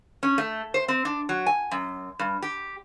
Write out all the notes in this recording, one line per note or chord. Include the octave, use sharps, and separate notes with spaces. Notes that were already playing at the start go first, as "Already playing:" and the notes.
C#4
A3
C5
C4
D4
F#3
G#5
F#2
G2
G4